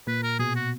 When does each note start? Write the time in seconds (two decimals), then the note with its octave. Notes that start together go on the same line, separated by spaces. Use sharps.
0.07 A#2 B4
0.23 A#4
0.39 B2 G#4
0.56 F#4